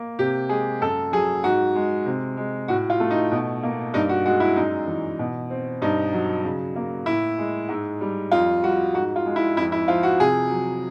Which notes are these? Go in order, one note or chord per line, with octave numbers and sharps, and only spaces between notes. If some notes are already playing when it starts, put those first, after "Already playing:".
Already playing: A#3
C3 G4
G#3 G#4
F#2 A4
F#3 G#4
G#2 F#4
G#3
C3
G#3
A2 F#4
F4
A3
D#4
B2
A#3
G2 D#4
F#4
G#3 F#4
E4
F#2 D#4
E3
B2
C4
G2 D#4
F#3
C#3
A#3
A2 E4
G#3
G#2
G3
F2 F4
G3 F#4
G#2 F#4
F4
G#3
E4
F2 E4
E4
F3 F4
F#4
C3 G#4
F#3